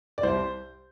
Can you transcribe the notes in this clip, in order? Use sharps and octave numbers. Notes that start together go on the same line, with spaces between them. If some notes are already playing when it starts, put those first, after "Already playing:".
D5
C2 C5